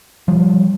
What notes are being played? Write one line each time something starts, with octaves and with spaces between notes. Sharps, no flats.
F3 G3